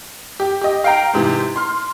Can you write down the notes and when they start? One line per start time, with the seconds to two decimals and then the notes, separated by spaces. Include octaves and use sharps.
0.40 G4
0.61 G4 D#5
0.84 F5 G5 A#5
1.13 G#2 C3 E3
1.56 C6 F6